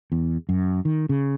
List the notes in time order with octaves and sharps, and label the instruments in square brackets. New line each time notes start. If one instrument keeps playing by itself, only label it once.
[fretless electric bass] E2
F#2
D#3
C#3